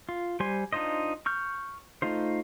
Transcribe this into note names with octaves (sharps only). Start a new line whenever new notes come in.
F4
G3 C5 G#5 C6
D4 D#4 F4 C5 D#5
C#6 F6 G6
A3 D#4 F4 C5